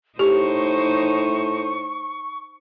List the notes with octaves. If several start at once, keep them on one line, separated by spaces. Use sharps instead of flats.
A2 D#4 G4 C5 C#6